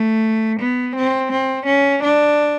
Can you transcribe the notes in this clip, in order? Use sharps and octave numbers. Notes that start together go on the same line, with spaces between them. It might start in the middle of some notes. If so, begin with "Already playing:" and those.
Already playing: A3
B3
C4
C4
C#4
D4